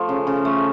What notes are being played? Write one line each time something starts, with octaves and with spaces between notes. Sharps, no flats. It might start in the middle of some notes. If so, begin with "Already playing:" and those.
Already playing: F3 A3
C#3
C#3
A3